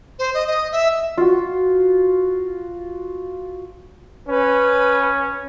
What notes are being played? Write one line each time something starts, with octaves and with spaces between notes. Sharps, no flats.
C5
D#5
D#5
E5
F4 F#4
C#4 B4